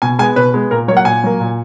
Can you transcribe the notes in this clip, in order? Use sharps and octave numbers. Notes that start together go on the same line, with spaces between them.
B2 G#5
G#3 B3 G#5
B2 B4
G#3 B3
A#2 A#4
F#3 A#3 C#5 F#5
A#2 G#5
F#3 A#3
A#2